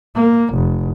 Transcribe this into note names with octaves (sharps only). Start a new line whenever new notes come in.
A#3
F1